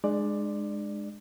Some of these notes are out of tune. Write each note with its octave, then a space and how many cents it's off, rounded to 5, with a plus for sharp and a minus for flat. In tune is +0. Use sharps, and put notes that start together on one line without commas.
G#3 +0 D4 +45 D5 +10